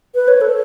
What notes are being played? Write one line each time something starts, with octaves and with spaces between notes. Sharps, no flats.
B4
C#5
A4